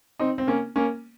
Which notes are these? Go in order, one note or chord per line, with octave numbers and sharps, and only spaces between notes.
C4 D#4
C4
A#3 C#4
A#3 C#4